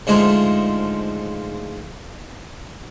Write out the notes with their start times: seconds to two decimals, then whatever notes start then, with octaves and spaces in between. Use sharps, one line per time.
0.07 D2 G#2 F3 G#3